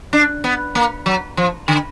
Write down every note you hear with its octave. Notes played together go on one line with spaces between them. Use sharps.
D4
B3
A#3
F#3
F3
D3